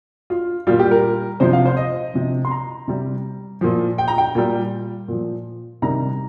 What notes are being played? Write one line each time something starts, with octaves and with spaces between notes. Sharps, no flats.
F4
A#2 G3 F4
G4
A#4
C3 F3 C5
F5
C5
D#5
C3 F3
C6
A#5
C3 G3
A#2 F3
G5
A#5
G5
A#2 G3
A#2 F3
C3 D#3 G3 A#5